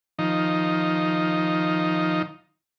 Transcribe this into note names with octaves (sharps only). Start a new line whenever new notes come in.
D#3 F3 D#4